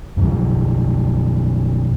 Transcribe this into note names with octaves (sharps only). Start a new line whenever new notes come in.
F#2 B2 F3 F#3